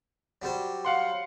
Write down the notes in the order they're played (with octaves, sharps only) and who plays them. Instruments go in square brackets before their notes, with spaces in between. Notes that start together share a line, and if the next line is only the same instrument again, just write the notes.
[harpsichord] F#3 G3 C5
[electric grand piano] F5 F#5 C6